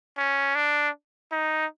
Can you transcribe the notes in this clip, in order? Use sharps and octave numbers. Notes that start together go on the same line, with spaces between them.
C#4
D4
D#4